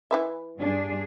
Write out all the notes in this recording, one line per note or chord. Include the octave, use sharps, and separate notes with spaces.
E3 B4 E5
G2 D4 G#4